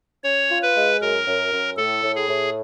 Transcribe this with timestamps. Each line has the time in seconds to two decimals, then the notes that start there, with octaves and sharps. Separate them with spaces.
0.24 C#4 C#5
0.49 F4
0.62 B4
0.75 G#3
1.00 F#2 A#4
1.26 F#2
1.52 F#2
1.77 A2 A4
2.03 A2
2.15 G#4
2.28 A2